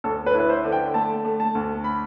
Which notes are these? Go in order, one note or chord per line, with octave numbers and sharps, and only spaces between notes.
D2 A4
B4
E4
B4
C5
D3
G5
A3 A5
A3
A5
D2
B5